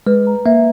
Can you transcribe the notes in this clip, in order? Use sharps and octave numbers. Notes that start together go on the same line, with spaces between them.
G#3 B4
A#5
A#3 E5